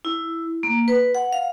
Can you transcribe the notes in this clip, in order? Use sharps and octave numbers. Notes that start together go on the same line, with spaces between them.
E4
A#3
B4
F#5
F5